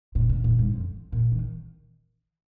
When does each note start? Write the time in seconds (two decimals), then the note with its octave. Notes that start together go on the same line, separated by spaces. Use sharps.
0.15 A#2
0.29 A#2
0.44 A#2
0.59 G#2
0.73 F2
1.12 A#2
1.32 D#3